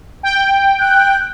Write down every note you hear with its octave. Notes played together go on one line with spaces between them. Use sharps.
G5
F#6